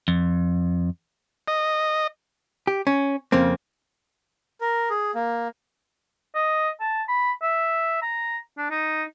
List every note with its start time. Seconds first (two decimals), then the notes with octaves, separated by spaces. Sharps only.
0.08 F2
1.48 D#5
2.67 G4
2.87 C#4
3.32 F2 C#3 A#3 C4
4.61 A#4
4.90 G#4
5.15 A#3
6.35 D#5
6.80 A5
7.09 B5
7.42 E5
8.02 A#5
8.58 D4
8.71 D#4